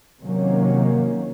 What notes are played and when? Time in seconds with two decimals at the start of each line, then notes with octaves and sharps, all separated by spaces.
0.21 C3 D#3 F#3 A#3 C#4